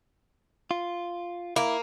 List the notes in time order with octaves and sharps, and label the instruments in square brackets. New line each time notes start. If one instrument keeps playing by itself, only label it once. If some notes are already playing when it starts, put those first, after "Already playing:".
[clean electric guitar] F4
[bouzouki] A#3 [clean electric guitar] E4